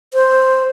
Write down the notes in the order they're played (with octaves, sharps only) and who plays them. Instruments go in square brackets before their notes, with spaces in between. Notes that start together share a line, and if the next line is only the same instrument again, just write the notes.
[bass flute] C5